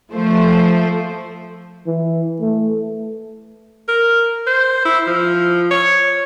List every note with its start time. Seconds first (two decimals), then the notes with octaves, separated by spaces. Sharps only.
0.12 F3 A3 C5
1.86 E3
2.40 A3
3.88 A#4
4.47 C5
4.85 E4
5.07 F3
5.71 C#5